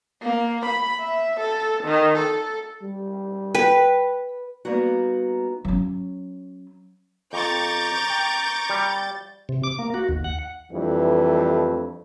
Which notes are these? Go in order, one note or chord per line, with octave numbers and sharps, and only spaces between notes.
A#3
B5
E5
A4
D#3
A4
G3
B4 G5
G3 A#3 B3 D#4 F#4
F#3 C#4
F2 A#5 C#6 D6 G6 A6
G5
G3
C3
D6
A#3
F#4
D#2
F#5
F2 E3 G3 A3 D4 B4